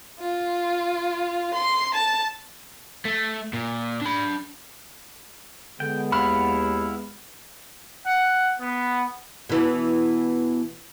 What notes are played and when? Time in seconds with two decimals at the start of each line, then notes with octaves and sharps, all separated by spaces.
0.19 F4
1.54 C6
1.94 A5
3.05 A3
3.53 A#2
4.01 D4 B5
5.80 D3 G#3 B3 G5
6.12 D#2 E4 F5 F#5 B5
8.07 F#5
8.60 B3
9.49 B2 E3